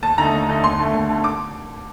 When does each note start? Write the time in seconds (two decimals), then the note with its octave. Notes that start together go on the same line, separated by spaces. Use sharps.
0.03 D#2 A5
0.18 D3 A3 D#4 A#5
0.34 D#2
0.49 D3 A3 D#4
0.64 D#2 C6
0.79 D3 A3
0.94 D#2
1.09 D3 A3
1.24 D6